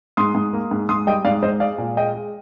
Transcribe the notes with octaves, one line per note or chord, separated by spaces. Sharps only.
G#2 C6 D#6
G#2
A#3
G#2
G#2 C6 D#6
G3 D#5 G5
G#2 D5 F5
G#2 C5 D#5
G#3 D5 F5
A#2
G#3 D#5 G5
G#3